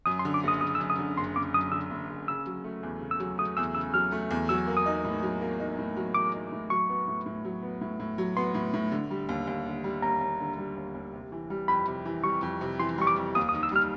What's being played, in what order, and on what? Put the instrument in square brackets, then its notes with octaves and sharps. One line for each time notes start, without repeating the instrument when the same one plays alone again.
[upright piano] F#2 [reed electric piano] D#6
[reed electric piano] C6
[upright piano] D3
[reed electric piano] D6
[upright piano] F#1 [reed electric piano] D#6
[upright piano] F#1 [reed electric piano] D#6
[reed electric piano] E6
[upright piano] F#2
[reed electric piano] D#6
[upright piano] D3
[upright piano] F#1 [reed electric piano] C6
[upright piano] F#1 [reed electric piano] D6
[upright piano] F#2 [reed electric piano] D#6
[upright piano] D3 [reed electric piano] E6
[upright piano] F#1
F#1
[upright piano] C#3 [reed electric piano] E6
[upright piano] F#3
A3
E2
C#3
[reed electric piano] E6
[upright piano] F#3
[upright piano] A3 [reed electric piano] D#6
[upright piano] E2 [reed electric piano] E6
[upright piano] C#3 [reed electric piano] E6
[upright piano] F#3 [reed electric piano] F6
[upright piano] A3
E2
[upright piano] F#3 [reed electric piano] E6
[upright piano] A#3
[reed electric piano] D#6
[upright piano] D#4
A2
F#3
A#3
D#4
A2
F#3
[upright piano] A#3 [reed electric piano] D6
[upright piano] D#4
A2
[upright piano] F#3 [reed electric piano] C#6
[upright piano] B3
A2
A2
F#3
B3
A2
A2
F#3
[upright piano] B3 [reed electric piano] C6
[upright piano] A2
A2
D3
G3
D#2
D#2
D3
G3
[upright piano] D#2 [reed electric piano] A#5
[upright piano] D#2
D3
G3
D#2
D#2
C3
E3
G3
[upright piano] F2 [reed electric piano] B5
[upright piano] C3
E3
[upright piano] G3 [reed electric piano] C#6
[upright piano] F2
C3
[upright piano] E3 [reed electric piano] C6
[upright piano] G3 [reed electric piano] C#6
[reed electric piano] D6
[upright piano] F2
[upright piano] D#2 [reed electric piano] D#6
[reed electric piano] D#6
[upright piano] D#3
[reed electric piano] E6
[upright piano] G3 [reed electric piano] F6